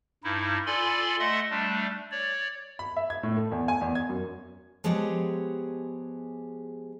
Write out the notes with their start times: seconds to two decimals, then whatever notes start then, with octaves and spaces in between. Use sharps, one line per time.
0.24 G2 D#4 E4
0.66 F4 A4 D5 G#5 B5 C6
1.19 A3 D#5 E5 F#5 C6
1.50 G3 A3 D4
2.11 C#5 D5
2.79 B5
2.97 E5
3.10 G#6
3.23 A2
3.36 A3
3.52 E2
3.68 G#5
3.81 E2
3.95 G#6
4.09 F#2
4.84 F3 G#3 B3 G4 G#4 C#5